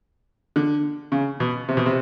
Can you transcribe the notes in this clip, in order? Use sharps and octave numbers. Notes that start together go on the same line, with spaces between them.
D3
C#3
B2
C3
B2
C3